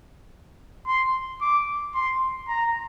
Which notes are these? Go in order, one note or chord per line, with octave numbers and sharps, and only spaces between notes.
C6
D6
C6
A#5